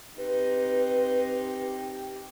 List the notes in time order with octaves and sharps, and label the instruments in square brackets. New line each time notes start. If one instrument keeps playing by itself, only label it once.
[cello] C4 D#4 [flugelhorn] G4 [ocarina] B4